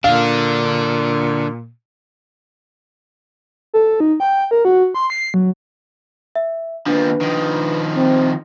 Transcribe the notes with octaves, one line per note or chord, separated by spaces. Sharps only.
A#2 D3 D4 F5
A4
D#4
G5
A#4
F#4
C6
C7
F#3
E5
D#2 F3 D4 B4
D#3 F3
C4